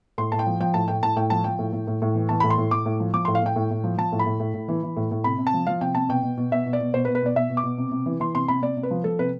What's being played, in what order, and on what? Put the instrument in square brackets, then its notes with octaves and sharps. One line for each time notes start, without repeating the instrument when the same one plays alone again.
[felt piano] A2 C6
A2 A5
G5
F3
F3 G5
A2 A5
A2 G5
A2 A5
A2 G5
F3 A5
F3 G5
A2
A2
A2
A2
E3
E3 A5
A2 B5
C6
A2
A2 D6
A2
F3
F3 D6
A2 C6
F5
A2 G5
A2
A2
F3
F3 A5
A2
B5
A2
A2
A2
E3
E3
A2
A2
C3 B5
C3
A5
F3
F3 F5
C3 G5
C3 A5
B2 G5
B2
B2
B2 E5
B2
D5
B2
B2 C5
B4
B2
B4
B2 D5
B2 E5
B2
D6
B2
C3
C3
E3
E3 C6
C3 C6
C3 B5
C3 D5
C3
B4
F3
F3 A4
C3 B4